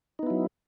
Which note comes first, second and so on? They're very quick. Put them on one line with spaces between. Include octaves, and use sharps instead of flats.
D#4 B3 E4 F#3